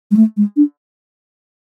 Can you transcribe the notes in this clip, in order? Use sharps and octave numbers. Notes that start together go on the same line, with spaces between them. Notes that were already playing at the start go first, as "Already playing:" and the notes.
G#3
A3
G#3
D4